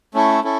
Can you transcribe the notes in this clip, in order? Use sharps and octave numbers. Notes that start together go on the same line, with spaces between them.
A3 C#4 E4 A4
C#4 E4 A4